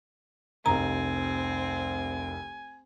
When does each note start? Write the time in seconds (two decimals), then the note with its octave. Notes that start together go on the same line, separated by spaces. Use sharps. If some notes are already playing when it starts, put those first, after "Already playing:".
0.66 F1 C2 C4 G#5 A#5